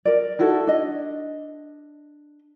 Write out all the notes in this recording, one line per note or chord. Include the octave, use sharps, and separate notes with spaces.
A#4 D5
D#4 E4 F#4 A4
D4 D#5